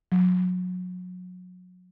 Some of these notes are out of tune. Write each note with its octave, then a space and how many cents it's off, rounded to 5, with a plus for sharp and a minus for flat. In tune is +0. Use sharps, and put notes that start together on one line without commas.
F#3 -30